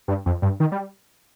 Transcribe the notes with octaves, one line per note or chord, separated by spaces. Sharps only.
G2
F2
G2
D#3
G3